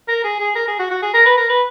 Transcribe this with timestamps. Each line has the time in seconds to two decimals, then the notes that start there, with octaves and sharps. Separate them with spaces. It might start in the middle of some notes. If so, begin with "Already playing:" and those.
0.08 A#4
0.24 G#4
0.40 G#4
0.55 A#4
0.67 G#4
0.79 F#4
0.91 F#4
1.03 G#4
1.14 A#4
1.26 B4
1.38 A#4
1.49 B4